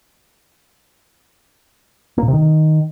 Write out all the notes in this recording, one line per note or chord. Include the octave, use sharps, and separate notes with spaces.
A#3
A#2
C3
D#3